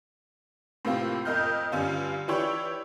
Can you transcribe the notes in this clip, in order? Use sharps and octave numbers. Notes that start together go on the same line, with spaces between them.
A2 C3 A#3 C4 F4
F2 A#4 D#5 F6 G6
G2 D3 C#4 F4
E3 D4 E4 G4 C#5